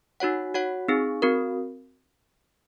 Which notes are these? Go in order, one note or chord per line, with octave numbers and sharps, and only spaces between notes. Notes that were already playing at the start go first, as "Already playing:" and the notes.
D#4 F#4 C#5 F#5
F#4 C#5 F#5
C4 D#4 G#4
C4 F#4 A#4